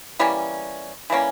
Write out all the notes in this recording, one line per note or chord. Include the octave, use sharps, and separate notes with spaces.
E3 G3 A#3 C#4
E3 G3 A#3 C#4